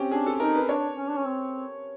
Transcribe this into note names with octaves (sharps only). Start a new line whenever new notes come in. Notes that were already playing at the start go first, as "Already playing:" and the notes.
Already playing: C4 C#4 G4
D4 G#4
A4
D#4 A#4
B4
D4 C#5
C#4
D4
C#4
C4